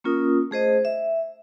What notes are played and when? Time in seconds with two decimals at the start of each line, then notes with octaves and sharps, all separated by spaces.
0.04 A#3 C#4 F4 A#4 D#6
0.51 A3 G#4 C5 D#5
0.85 E5